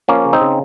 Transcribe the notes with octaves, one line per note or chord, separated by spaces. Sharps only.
F3 A#3 C#4
C#3
C4 D#4
C#3